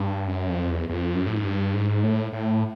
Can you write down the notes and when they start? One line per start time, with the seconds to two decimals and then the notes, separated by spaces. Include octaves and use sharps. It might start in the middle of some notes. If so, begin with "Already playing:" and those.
Already playing: G2
0.27 F#2
0.49 F2
0.71 E2
0.89 E2
0.94 F2
1.15 F#2
1.26 A2
1.35 G#2
1.44 G2
1.74 G#2
2.03 A2
2.33 A2